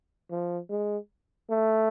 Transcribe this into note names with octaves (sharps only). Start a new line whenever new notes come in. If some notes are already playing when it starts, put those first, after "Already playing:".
F3
G#3
A3